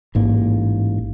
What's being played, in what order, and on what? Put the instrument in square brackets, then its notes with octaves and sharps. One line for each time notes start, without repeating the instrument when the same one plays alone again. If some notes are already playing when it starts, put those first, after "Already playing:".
[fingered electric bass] A1 G#2 A#3